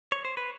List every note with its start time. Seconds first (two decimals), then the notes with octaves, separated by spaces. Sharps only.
0.12 C#5
0.25 C5
0.37 B4